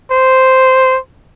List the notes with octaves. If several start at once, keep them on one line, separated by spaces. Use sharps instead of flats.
C5